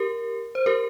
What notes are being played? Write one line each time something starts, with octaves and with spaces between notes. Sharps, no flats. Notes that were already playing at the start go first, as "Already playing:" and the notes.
Already playing: G4 A#4
C5
G4 A#4